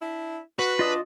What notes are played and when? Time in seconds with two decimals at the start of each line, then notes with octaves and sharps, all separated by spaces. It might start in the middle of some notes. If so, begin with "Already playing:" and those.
0.02 D4 E4
0.59 F#4 B4
0.79 F#3 D4 F4 D#5 D#6